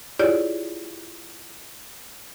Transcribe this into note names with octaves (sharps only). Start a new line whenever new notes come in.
E4 F4 G4 G#4 C#5 D5